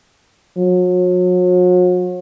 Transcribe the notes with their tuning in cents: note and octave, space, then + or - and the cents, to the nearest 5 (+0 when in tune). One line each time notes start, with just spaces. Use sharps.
F#3 -40